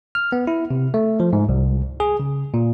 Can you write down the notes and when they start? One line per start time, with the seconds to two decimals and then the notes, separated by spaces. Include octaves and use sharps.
0.15 F6
0.32 B3
0.47 E4
0.71 C3
0.94 A3
1.20 F3
1.33 G#2
1.49 C2
2.00 G#4
2.20 C#3
2.54 A#2